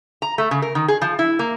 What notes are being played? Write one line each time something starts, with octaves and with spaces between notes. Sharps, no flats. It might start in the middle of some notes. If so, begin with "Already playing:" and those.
A#5
A3
C#3
A#4
D#3
G#4
F3
E4
A#3